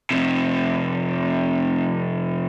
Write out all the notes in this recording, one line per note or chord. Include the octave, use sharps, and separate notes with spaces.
F2 C3